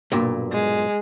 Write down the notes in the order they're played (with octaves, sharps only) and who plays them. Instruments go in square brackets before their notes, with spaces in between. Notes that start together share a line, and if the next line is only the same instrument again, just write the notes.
[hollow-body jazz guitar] B1 G2 A#2
[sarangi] G#3